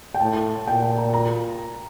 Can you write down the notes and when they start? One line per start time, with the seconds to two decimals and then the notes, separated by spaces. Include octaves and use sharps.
0.14 G5
0.20 A2 A5
0.67 A#2 G5
0.82 G5
0.97 A#5
1.13 A#5